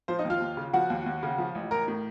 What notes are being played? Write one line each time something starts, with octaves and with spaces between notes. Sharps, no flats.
F3 C5
D#4 D#5
D#2
F4 F5
D#2
C#3
F3 F#4 F#5
D#2
D#2
C#3
F3
A1
A1 A#4 A#5
A2